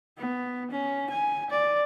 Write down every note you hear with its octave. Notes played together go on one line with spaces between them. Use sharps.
B3
C#4
G#5
D5